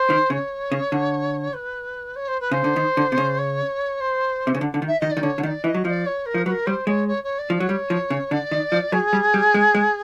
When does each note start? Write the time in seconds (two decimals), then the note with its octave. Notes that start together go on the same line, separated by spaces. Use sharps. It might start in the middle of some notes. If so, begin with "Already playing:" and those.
Already playing: C5
0.10 D#3
0.30 C#3 C#5
0.72 C#3
0.92 D3
1.53 B4
2.15 C#5
2.27 C5
2.40 B4
2.51 C#3 C5
2.64 D3
2.76 D#3
2.97 D3
3.12 C3
3.18 C#3
3.38 C#5
4.00 C5
4.47 C3
4.55 C#3
4.61 D3
4.74 D3
4.82 D#3
4.87 E5
5.00 D#3 D#5
5.11 D5
5.17 D#3
5.23 D3 C#5
5.38 D3
5.43 D#3 D#5
5.47 D5
5.64 E3 E5
5.68 D#5
5.74 F#3
5.85 F3 D#5
5.90 D5
6.06 C#5
6.25 A#4
6.34 F3
6.46 F#3 B4
6.50 A#4
6.66 G3 C5 C#5
6.87 G#3 C#5
7.08 C#5
7.23 C#5
7.38 D5
7.50 F3 D5
7.58 F#3 C#5
7.69 G3
7.90 F3
8.10 C#3
8.31 D3 D5
8.51 D#3
8.72 F3
8.92 F#3 G#4
9.13 G3
9.34 G3
9.54 G#3
9.75 G#3